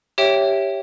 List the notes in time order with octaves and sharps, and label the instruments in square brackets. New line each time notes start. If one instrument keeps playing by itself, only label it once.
[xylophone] G4 C#5 E5 G5